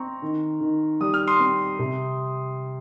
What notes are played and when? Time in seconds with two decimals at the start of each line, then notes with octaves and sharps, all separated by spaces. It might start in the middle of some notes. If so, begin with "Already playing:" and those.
Already playing: C4 A#5 C#6
0.22 D#3
0.61 D#3
1.00 G3 D#6
1.14 F6
1.27 C6 D#6
1.40 C4
1.79 C3